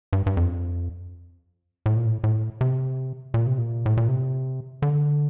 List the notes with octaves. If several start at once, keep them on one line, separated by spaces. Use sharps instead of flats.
G2
G2
F2
A2
A#2
A2
A2
C3
A#2
C3
A#2
A2
A#2
C3
D3